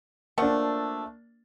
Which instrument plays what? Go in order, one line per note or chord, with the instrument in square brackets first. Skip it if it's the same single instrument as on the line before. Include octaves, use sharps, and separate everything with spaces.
[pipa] F3 A3 F#5 [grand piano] A#3 D4